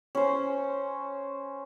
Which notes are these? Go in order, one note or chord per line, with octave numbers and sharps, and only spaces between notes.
C#4 C5